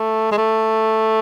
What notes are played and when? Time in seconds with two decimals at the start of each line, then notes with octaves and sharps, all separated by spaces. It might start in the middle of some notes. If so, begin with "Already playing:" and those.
Already playing: A3
0.32 G#3
0.38 A3